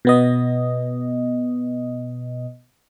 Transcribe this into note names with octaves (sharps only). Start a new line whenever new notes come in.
B2 B3 D#5